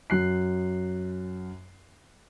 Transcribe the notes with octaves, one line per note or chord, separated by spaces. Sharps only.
F#2 F#6 C7